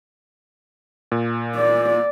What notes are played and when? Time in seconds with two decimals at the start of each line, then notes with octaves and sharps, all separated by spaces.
1.12 A#2
1.56 D5